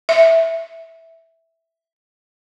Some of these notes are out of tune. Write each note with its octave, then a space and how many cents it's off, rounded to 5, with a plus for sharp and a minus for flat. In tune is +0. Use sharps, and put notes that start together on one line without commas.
E5 -5